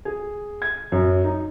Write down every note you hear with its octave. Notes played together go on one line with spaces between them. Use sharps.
G#4
G#6
F#2
D#4